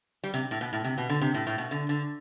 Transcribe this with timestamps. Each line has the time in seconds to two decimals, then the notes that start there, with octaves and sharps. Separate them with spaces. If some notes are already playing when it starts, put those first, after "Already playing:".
0.24 G3
0.34 C3
0.51 A2
0.61 B2
0.73 A2
0.84 C3
0.98 B2
1.09 D3
1.21 C3
1.34 A2
1.47 A2
1.58 B2
1.71 D3
1.89 D3